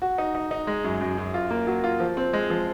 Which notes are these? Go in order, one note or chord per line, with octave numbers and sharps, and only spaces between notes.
F#4
D#4
D#4
D#4
G#3
F#2
F#2
F#2
F4
A#3
F#3
F4
F3
C4
G#3
F3